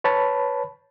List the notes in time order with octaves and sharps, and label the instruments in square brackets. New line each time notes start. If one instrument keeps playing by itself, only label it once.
[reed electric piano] B4 C#5 A5 B5